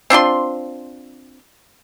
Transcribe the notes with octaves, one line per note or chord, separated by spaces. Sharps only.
C4 D4 F4 C6